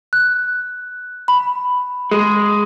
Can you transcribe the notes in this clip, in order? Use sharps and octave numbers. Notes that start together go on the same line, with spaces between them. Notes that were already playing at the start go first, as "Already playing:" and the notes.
F#6
B5
G#3